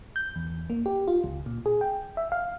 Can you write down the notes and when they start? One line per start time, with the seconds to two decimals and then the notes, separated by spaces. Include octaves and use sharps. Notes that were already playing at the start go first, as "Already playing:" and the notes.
0.16 G6
0.36 E2
0.70 A#3
0.86 G4
1.08 F4
1.24 C#2
1.46 A#2
1.66 G#4
1.81 G5
2.17 E5
2.32 F5